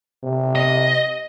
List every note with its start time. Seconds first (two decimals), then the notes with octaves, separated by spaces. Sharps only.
0.23 C3
0.55 D#5